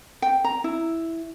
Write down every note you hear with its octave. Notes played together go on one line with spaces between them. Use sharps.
G5
A#5
E4